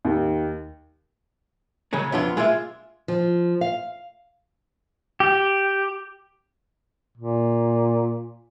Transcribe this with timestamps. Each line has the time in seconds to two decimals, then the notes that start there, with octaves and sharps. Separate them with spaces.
0.05 D#2
1.93 C#3 F#3 G#3 C#4
2.12 F2 B3 D4 F4
2.37 G#3 F4 D5 E5
3.08 F3
3.61 F5
5.20 G4
7.17 A#2